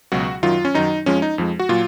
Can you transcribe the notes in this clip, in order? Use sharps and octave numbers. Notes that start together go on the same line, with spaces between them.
C#2 B2 F#3 F#4
F#2 D#3 F#3 F4
C#4
F#2 D#3 F#3 D#4
F2 F3 G#3 C#4
D#4
F2 F3 G#3
F#4
A#2 F#3 F4